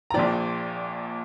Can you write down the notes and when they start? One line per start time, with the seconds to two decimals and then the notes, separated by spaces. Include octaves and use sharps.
0.10 A#5
0.14 A#1 A#2 F3 D5 G5